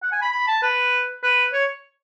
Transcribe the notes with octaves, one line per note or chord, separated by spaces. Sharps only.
F#5
G#5
B5
B5
A5
B4
B4
C#5